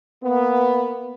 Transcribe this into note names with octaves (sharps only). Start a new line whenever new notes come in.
A#3 B3